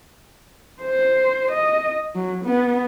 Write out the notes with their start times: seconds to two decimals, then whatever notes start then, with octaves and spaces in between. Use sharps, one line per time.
0.82 C5
1.52 D#5
2.15 F#3
2.45 B3